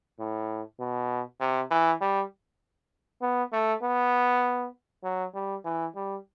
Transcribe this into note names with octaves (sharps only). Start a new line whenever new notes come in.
A2
B2
C3
E3
G3
B3
A3
B3
F#3
G3
E3
G3